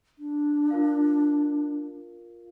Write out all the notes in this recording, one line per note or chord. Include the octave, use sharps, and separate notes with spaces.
D4
F4 A#4 F5